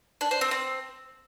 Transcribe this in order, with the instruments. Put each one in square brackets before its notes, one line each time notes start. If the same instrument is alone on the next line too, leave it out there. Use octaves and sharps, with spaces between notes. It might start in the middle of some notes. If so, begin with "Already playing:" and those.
[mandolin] D4
C5
C4
C4